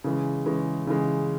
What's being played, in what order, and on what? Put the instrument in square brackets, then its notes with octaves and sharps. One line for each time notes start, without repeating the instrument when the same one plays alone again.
[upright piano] C#3 E3 G#3
C#3 E3 G#3
C#3 E3 G#3